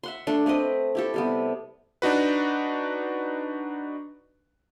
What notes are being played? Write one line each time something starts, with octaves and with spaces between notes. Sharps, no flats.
E5 F#5 C6
A3 D4 C6
A3 C4 B4 D#5
E4 G4 A4
C3 G3 B3
D4 D#4 F#4 B4